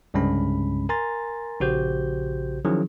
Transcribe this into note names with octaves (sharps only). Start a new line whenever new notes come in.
C2 G2 C#3 G#3 C#4 B5
A#4 G#5 A#5 C6 A6
A#1 C#3 F#4 G4 C5 G6
D#3 F3 F#3 C#4 E4 G#4